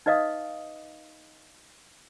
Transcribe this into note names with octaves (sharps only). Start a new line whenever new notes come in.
D#4 B4 D#5 F5 D#6